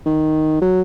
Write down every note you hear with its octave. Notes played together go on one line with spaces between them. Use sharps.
D#3
F#3